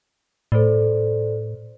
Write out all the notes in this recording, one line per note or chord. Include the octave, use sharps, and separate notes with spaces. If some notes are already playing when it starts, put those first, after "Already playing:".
A2 A4 C5 D5